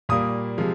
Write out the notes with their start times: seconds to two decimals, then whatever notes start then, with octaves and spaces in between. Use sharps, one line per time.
0.09 A#2 G3 A#3 D#6
0.58 C3 F3 G#3